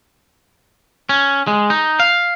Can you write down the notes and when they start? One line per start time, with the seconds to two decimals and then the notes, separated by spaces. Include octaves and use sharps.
1.09 C#4
1.47 G#3
1.70 D#4
2.00 F5